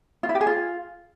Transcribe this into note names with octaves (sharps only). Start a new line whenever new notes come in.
F4
E4
G4
G#4
F4